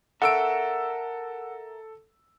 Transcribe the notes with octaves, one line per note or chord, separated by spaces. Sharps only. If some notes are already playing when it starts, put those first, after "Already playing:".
A4 A#4 E5 F#5 E6 D7